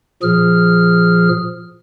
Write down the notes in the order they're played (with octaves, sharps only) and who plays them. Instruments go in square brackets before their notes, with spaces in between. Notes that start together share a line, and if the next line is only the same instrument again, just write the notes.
[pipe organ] A#2 F3 G#4 F6